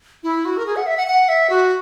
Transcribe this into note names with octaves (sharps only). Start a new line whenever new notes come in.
E4
F#4
A#4
G#4
F#5
E5
F#5
F#5
E5
F#4